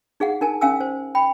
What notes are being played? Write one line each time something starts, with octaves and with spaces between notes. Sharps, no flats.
D#4 G#4 F5 F#5
D#4 A#4 G#5 A5
C#4 F5 G#5 E6
C5
G5 B5